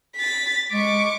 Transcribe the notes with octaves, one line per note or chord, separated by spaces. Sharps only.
A6 B6
G#3 C#6 D6